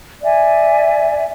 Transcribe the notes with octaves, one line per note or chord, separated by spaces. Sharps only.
D5 E5 G#5